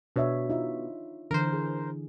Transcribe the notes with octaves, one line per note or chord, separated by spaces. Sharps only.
B2 D4 C#5 E5
D#4 F4 E5
D3 E3 A#4 C5
G#4